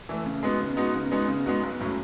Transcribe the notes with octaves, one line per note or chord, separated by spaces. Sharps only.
E3 A3
C#3
G#3 B3 D#4 F#4
C#3
G#3 B3 D#4 F#4
C#3
G#3 B3 D#4 F#4
C#3
G#3 B3 D#4 F#4
B1
A2 F#3 C#4